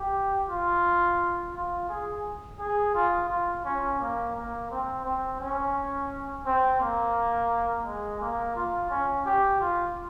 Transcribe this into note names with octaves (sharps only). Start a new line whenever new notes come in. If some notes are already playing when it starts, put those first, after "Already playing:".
Already playing: G4
F4
F4
G#4
G#4
F4
F4
C#4
A#3
A#3
C4
C4
C#4
C4
A#3
G#3
A#3
F4
C#4
G4
F4